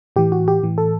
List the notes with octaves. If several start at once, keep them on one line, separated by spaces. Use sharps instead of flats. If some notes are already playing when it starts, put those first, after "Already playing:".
A2 E3 G4
F#4
G4
A2 E3
A4